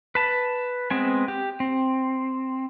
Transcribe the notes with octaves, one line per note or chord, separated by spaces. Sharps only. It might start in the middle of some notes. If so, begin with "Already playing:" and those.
B4 A5
G#3 B3 C4 G#5
G4
C4